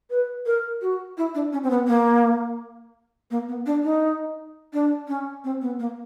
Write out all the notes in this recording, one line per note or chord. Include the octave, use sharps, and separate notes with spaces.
B4
A#4
F#4
E4
D4
C#4
C4
B3
A#3
A#3
B3
D4
D#4
D4
C#4
C4
B3
A#3